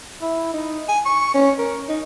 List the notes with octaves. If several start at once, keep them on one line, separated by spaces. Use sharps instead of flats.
E4
D#4
G#5
C#6
C#4
A#4
D#4